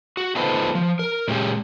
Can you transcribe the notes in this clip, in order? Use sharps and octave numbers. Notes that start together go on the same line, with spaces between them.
F#4
B3 D#4 F4 A4 B4 C5
F3
A#4
A#2 G#3 C#4 G4